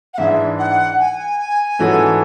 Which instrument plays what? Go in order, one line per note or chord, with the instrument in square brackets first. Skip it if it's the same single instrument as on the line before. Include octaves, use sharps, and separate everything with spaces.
[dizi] F#5
[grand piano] G#2 E3 G#3 D4 [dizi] E5
[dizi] F#5
G#5
[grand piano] G#2 E3 A3 C#4 F#4